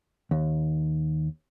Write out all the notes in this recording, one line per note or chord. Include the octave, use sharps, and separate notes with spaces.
D#2